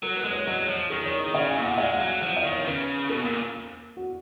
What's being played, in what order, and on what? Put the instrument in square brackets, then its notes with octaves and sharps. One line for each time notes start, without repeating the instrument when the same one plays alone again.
[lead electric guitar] F#3 [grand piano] A#4
[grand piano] B4
[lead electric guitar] G#3
[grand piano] C#5
[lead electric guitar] F#3 [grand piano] D#5
[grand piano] C#5
[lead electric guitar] F3
[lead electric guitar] D#3 [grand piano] G#4
[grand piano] C#5
D#5
[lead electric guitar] C#3 [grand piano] F5
[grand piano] G#5
[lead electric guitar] A#2
[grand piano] F#5
[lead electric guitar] G#3 [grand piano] F5
[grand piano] F#5
[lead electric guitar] F#3
[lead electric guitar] F3 [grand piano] F#5
[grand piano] F5
[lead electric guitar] D#3
[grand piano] C#5
[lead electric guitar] C#3 [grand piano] B4
[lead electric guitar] B2 [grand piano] A#4
[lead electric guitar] A#2
[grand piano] F#4